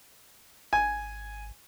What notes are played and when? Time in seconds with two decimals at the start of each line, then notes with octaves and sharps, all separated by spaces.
0.73 G#1 G#5